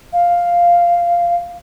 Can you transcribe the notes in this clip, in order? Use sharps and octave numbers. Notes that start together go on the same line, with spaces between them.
F5